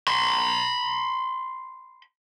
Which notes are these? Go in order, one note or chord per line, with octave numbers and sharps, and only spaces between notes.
B5 C6